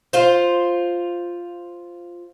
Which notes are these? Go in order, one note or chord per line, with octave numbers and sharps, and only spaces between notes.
F4 C5